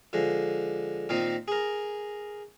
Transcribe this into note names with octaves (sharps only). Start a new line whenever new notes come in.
D3 F3 G#3
A#2 D#3 C4 D#4
G#4 A#4